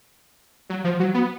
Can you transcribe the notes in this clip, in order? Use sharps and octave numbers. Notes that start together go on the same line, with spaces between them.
F#3
F3
F#3
B3